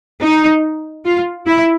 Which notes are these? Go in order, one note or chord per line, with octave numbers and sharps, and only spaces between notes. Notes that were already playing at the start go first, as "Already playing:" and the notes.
D#4
F4
E4